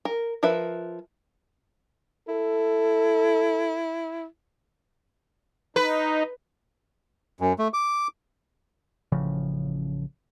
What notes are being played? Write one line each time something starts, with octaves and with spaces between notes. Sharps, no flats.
A#4
F3 A#4 B4 E5
E4 A4
D#4 B4
F#2
A3
D6
A1 C#3 F3